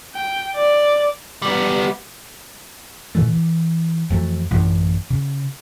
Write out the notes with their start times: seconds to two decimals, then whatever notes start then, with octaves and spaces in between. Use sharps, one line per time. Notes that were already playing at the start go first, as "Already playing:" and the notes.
0.15 G5
0.56 D5
1.42 G3 B3
3.15 A#2 D#3 E3 A3
3.33 E3
4.10 F2 E3 F#3 A3
4.51 A1 F#2 E3
5.10 C#3